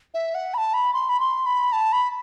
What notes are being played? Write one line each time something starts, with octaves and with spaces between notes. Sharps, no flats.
E5
F#5
B5
A5
B5
C6
B5
C6
B5
A5
B5